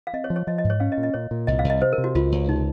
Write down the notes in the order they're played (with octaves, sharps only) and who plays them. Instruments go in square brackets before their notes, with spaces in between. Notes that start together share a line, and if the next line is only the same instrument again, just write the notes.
[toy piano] F5
[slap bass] C4 [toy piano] D#5
[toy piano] C#5
[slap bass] F3
[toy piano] C#5
[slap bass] F3 [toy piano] D#5
[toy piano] D#5
[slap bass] G#2
[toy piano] C#5
[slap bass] C#4 [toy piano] F5
[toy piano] D#5
[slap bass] A#2
[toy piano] D#5
[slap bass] A#2 [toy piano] C#5
[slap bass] A#2
[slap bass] C2 [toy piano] D#5
[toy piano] F5
[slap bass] C2
[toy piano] D#5
[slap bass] C3 [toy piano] C5
[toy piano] A#4
[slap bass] C3
[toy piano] F#4
[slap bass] C#2 [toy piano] F4
[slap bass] C#2
[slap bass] C3 [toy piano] D#4